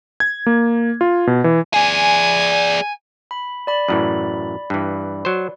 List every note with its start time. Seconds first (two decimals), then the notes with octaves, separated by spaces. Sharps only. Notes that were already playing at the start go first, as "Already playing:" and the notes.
0.20 G#6
0.46 A#3
1.01 F4
1.27 B2
1.44 E3
1.74 G#4 D5 G#5
3.31 B5
3.67 D5 B5
3.88 F#2 A2 E3
4.70 G2 E3
5.25 F#3 C5